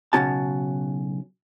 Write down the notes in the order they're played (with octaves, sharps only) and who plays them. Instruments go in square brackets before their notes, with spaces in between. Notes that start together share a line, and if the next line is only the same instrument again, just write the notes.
[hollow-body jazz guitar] B1 F#2 C#3 C#4 F#4 A5